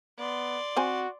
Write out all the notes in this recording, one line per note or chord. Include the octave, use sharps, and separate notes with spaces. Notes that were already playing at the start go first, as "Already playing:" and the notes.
B3 D5 C6
C4 F#4 C5 G#5